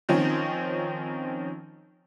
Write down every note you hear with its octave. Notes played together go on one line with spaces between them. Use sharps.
D#3 F3 C4 C#4 D#4